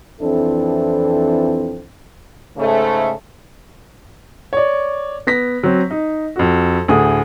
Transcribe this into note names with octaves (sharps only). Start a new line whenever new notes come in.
F2 E3 C4 D4 E4 A4
G#2 C#3 A3
C#5 D5
B3 A#6 B6
F#3 C4
D#4
F2 F#4
D2 A2 G#4 D#6